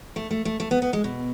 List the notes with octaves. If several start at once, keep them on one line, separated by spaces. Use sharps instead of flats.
A3
A3
A3
A3
B3
B3
G#3
B2